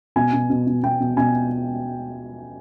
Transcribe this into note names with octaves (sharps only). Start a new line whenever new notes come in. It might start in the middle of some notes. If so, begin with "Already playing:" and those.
B2 G#5
B2
B2
B2
B2 G5
B2
B2 G#5